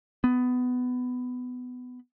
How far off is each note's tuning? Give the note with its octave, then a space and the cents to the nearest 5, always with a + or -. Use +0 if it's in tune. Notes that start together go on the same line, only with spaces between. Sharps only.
B3 +15